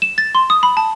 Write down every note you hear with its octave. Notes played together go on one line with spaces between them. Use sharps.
E7
A6
C6
D#6
B5
A5